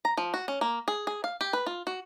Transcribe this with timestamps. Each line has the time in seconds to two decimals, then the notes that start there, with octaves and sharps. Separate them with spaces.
0.05 A#5
0.18 F3
0.34 F#4
0.48 C#4
0.61 A#3
0.88 G#4
1.07 G#4
1.24 F5
1.41 G4
1.53 B4
1.66 F4
1.87 F#4